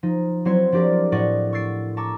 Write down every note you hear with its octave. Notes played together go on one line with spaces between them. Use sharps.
F3 D#4
F#3 C4 E4 C5 C#5 C6
F3 D4 G4 A#4 D5
A2 C4 D5 D#5 F#5 C#6
C#6 E6 A6 C7 D7
A5 A#5 C#6 D6 E6